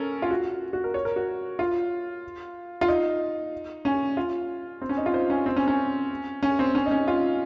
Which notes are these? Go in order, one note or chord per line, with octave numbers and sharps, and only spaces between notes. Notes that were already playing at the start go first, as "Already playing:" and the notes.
Already playing: C#4 A4 A#4
F4
F#4
F#4
A#4
C#5
A#4
F#4
F4
F4
D#4
C#4
F4
C4
C#4
D#4
F4
C5
C#4
C4
C#4
C#4
C#4
C4
C#4
D#4
C#4
F4